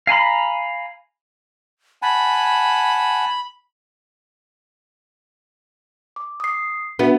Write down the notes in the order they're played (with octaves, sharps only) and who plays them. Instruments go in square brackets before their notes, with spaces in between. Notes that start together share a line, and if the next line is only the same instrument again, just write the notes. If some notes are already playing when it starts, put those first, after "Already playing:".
[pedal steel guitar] F5 G#5 A#5 B5
[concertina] F#5 G#5 A5 [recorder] B5
[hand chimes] D6
D#6 C7
[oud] B3 [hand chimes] D4 F#4 E5